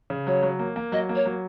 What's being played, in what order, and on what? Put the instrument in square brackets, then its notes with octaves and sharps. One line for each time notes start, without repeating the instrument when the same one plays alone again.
[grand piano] C#3
[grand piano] F#3 [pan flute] C#5
[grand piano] F#3
A#3
A#3
[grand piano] F#3 [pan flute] D#5
[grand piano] A#3
[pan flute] C#5
[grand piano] F#3